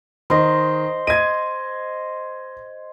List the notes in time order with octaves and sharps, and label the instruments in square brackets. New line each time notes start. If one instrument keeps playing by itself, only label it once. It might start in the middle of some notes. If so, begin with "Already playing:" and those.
[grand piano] D#3 [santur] C5 D#5
[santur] D#5 [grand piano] G#6 D#7